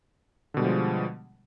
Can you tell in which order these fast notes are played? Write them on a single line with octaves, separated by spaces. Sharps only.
D3 B2 G3 G#3 F3